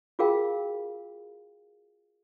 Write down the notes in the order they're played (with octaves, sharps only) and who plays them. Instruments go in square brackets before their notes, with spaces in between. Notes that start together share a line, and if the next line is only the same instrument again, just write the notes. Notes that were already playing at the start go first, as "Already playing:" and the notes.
[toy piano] F4 F#4 G#4 A#4 F5 G5